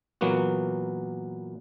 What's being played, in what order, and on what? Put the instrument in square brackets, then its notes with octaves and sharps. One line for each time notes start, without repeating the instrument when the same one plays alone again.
[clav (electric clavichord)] A#2 E3 F#3 A#3 B3 F#4